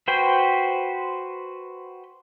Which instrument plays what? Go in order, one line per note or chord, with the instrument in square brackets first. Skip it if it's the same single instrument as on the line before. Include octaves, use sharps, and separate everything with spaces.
[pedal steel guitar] F#4 B4 C5 G5